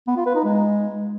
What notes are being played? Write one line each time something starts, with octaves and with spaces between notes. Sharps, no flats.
B3
F4
B4
D#4
G#3